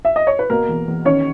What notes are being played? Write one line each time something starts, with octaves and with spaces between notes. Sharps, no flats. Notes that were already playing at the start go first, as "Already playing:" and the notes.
E5
D#5
C#5
B4
B2 A#3 A#4
E2
E2
D#3 C#4 C#5